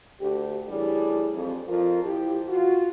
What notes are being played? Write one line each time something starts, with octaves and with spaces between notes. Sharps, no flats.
D2 G4
A2 E3 G3 D4 G#4
F2
F2 F3 F4 A#4
F3 E4 G4
F4 F#4